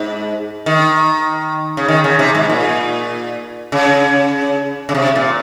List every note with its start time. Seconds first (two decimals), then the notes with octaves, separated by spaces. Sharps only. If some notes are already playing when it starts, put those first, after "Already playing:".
Already playing: G#2
0.66 D#3
1.77 C#3
1.89 D#3
2.04 C#3
2.19 C3
2.35 G#2
2.49 A#2
3.72 C#3
4.89 C#3
4.95 C3
5.16 A#2